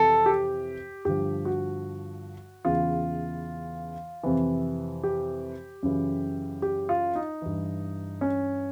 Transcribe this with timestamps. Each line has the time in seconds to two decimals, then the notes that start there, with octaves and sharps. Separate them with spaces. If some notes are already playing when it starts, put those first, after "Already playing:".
Already playing: F2 C3 E3 A4
0.26 G4
1.05 G2 D3 F3 G4
1.45 F#4
2.64 E2 C#3 E3 F4
4.23 F2 C3 E3
5.03 G4
5.83 F#2 C#3 E3
6.62 G4
6.89 F4
7.15 D#4
7.42 G2 E3
8.21 C#4